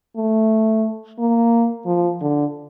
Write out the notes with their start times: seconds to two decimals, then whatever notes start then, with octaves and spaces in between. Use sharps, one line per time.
0.16 A3
1.19 A#3
1.86 F3
2.21 D3